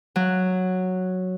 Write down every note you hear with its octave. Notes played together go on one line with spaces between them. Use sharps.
F#3